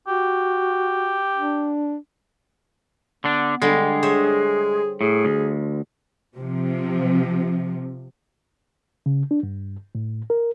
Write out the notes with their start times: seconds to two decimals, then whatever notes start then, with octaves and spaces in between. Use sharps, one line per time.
0.07 F#4 G4
1.36 D4
3.24 D3 B3 D4
3.62 D3 G3 G#3
4.03 G#4 C5 C#5 E5
5.01 A2 G#4
5.25 D2
6.37 C3 F3
9.06 C#3
9.31 D4
9.43 G2
9.95 A2
10.30 A#4